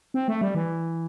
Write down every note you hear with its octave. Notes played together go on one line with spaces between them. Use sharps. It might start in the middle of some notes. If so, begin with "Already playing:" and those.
C4
A3
G3
E3